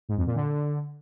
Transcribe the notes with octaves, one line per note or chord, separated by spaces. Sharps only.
G#2
F2
A#2
D3